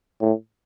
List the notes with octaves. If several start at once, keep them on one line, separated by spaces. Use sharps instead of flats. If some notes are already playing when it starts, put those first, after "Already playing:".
A2